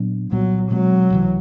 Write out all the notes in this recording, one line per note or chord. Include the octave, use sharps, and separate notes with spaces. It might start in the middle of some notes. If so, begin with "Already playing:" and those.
Already playing: A#2 F#3 B3 D4
C2 A#2 F#3 G3 B3
B2 F#3 G#3 C4
C#2 C3 E3